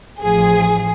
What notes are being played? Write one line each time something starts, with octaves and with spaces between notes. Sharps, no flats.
A1 F3 G#4